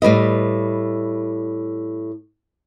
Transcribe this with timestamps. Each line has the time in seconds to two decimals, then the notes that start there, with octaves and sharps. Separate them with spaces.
0.02 A2 G3 B4 D#5